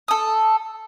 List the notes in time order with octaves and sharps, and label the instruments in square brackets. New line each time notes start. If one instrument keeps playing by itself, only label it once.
[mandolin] A4 D#6